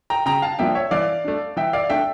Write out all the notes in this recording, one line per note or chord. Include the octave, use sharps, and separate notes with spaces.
G5 A#5
C#3 G5 A#5
F5 A5
F3 A#3 D4 E5 G5
C#5 E5
E3 D5 F5
A3 D4
E3 E5 G5
D5 F5
A3 D4 E5 G5